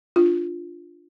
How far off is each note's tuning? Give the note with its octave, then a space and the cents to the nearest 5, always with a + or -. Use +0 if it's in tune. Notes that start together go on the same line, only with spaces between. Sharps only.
D4 +5 F4 +0